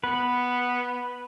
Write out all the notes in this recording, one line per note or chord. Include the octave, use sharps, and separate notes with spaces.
B3 B4